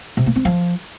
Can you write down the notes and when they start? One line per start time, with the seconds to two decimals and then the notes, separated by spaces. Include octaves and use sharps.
0.17 C3
0.26 A#3
0.36 C4
0.45 F3